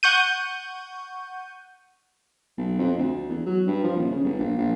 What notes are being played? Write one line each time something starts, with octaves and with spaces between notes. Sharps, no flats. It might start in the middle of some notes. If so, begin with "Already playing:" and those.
F#5 C#6 G6 D#7
B1
F2
D2
E2
F#3
G2
F3
D#1
C#3
G1
A#1
A#1